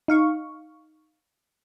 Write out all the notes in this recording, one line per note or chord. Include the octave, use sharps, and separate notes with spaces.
D#4 F5 C#6